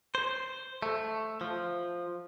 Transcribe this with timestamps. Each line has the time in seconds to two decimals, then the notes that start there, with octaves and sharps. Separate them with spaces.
0.15 C5
0.83 A3
1.41 F3